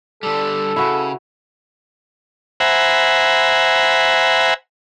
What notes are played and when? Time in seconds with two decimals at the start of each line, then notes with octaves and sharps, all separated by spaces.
0.23 D3 G3 A4
0.76 C#3 E4 F#4 B4
2.60 C5 E5 F#5 G#5 A#5 B5